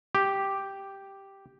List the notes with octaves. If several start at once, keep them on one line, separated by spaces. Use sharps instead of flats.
G4